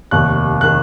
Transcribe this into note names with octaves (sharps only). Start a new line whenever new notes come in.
F1 D#2 D#3 F#6
D#3 F#6